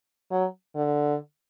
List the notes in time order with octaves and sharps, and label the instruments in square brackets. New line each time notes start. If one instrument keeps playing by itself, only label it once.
[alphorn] F#3
D3